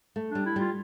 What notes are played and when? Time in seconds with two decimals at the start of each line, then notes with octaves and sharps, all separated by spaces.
0.16 A3
0.31 G3 D4
0.46 E4
0.56 G3 F4